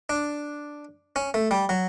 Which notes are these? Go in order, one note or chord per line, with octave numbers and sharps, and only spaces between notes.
D4
C#4
A3
G3
F#3